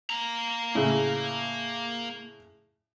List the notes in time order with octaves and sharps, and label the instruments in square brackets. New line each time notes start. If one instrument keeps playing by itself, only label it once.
[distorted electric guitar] A#3 A#5
[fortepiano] A2 C#3